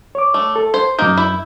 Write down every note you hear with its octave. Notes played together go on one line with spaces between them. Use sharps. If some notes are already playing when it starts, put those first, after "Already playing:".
C#5 D6
A3
A4
C5
F#2 A#3 D#4 G6
E4